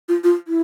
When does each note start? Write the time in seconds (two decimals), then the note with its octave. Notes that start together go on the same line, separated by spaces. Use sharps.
0.08 F4
0.24 F4
0.47 E4